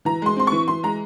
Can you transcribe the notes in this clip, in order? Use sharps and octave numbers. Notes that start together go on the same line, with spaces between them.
E3 A#5
G#3 C6
C4 C6
E3 C#6
E3 C6
G#3 A#5